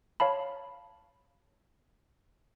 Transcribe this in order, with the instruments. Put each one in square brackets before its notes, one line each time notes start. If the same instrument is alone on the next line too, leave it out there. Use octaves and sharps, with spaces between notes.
[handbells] C#5 F5 A5 B5